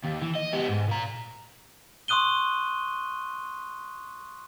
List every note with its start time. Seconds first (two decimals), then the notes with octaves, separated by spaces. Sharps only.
0.04 D#2
0.22 E3
0.36 D#5
0.53 B3 G4
0.68 G#2
0.88 A#2 A#5
2.08 C6 C#6 D#6 F#6 D#7 G7